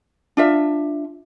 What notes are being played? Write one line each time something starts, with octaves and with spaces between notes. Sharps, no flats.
D4 F4 E5